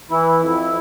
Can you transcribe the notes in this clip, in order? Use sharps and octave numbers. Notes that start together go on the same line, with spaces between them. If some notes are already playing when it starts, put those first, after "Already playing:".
E3 E4
F2